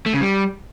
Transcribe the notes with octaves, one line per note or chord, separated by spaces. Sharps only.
A3
C#3
G3